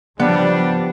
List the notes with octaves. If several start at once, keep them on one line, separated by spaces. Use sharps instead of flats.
C#3 F3 G3 B3 D4